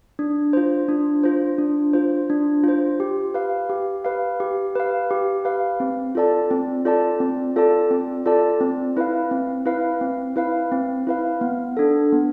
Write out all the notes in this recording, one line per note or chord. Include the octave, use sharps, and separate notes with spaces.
D4
F4 C5
D4
F4 C5
D4
F4 C5
D4
F4 C5
G4
B4 F5
G4
B4 F5
G4
B4 F5
G4
B4 F5
C4
F4 A4 D5 A5
C4
F4 A4 D5 A5
C4
F4 A4 D5 A5
C4
F4 A4 D5 A5
C4
E4 B4 F5
C4
E4 B4 F5
C4
E4 B4 F5
C4
E4 B4 F5
B3
D4 A4
B3